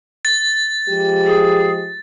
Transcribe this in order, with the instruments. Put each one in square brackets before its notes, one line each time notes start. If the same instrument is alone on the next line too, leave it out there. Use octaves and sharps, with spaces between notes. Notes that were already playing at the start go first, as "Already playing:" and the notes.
[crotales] A6
[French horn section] F3 G#3 G4
[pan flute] G#4